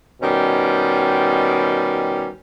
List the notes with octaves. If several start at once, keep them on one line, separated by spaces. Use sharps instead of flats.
B2 D#3 G3 C#4